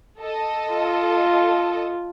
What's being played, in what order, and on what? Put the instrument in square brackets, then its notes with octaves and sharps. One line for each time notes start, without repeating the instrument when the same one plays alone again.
[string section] A4 D#5
[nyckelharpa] F4